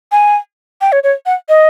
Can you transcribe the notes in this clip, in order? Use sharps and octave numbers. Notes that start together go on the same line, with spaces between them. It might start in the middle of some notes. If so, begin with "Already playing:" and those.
G#5
G5
C#5
C#5
F#5
D#5